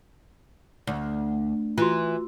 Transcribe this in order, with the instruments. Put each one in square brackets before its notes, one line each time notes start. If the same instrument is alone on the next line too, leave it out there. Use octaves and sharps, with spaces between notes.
[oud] D2
[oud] E3 [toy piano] F4 F#4